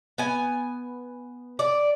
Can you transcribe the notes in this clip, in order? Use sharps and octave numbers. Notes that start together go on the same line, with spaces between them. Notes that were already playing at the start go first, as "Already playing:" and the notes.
B3 G#5
D5